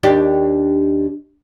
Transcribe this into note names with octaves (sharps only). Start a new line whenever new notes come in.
D#2 D4 G4